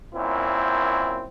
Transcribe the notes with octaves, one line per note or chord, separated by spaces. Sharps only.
F#2 A#2 C4 E4